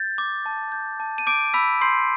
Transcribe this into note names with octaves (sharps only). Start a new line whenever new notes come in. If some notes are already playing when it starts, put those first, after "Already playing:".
Already playing: G6 A6
D6
A5
G6
A5
D#7
D6 G6 D7
B5 E6 B6
C6 G6 C7